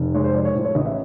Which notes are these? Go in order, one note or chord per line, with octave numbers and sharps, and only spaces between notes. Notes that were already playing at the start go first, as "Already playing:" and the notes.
Already playing: F1
G#3 C#5
C5
F3 D5
C#5
A2 C5
C#5
A1 D#5
E5